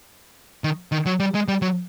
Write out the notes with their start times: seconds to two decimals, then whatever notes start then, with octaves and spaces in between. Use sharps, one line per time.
0.64 D#3
0.92 D#3
1.06 F#3
1.20 G3
1.35 G#3
1.48 G3
1.62 F#3